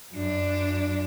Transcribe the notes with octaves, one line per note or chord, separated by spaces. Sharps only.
F#2 D4